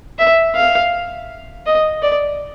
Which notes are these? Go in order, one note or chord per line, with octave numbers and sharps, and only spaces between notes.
E5
F5
D#5
D5